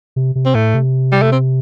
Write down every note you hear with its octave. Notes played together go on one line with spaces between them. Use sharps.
C3
C3
C4
A2 A3
C3
G3
A3
C4